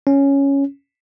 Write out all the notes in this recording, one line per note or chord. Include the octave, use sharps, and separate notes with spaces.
C#4